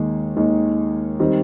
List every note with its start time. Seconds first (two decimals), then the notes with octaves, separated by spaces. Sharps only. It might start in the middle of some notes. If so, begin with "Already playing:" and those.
Already playing: D#2 D#3 G#3
0.36 D#2 D#3 G#3
1.20 D#3 G3 C4